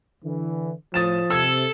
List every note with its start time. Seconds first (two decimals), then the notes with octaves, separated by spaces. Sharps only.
0.23 D3 E3
0.94 A2 F3 D#6 A6 E7
1.30 C3 A4 E6 G#6